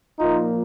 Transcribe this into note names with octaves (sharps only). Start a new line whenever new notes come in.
A#2 F3 A#3 D#4 F4